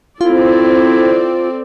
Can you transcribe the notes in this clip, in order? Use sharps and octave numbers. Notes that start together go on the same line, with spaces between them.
C4 E4 F4 A4 D5